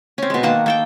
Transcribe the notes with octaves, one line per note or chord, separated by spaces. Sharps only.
C4 C#4
B2 G#3
D#3 A#3 F#5 A5
A#3 A4 G5